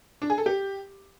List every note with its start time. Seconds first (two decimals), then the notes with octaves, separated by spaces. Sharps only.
0.22 D4
0.30 G#4
0.38 A4
0.46 G4